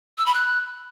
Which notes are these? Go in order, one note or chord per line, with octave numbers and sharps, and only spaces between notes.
E6
B5
F#6